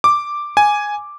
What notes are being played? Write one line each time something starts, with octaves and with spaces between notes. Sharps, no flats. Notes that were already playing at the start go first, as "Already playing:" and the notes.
D6
G#5